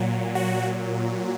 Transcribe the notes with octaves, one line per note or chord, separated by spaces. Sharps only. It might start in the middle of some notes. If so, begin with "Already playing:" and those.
Already playing: A#2 F#3
F#4